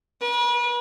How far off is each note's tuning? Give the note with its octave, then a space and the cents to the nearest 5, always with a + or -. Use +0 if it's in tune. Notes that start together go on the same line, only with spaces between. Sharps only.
B4 -40